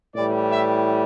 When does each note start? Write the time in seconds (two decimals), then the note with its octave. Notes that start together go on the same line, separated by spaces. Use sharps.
0.13 A2 E3 G3 D5
0.50 E5